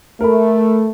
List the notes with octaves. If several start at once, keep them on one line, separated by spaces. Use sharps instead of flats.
A3 A#4 B5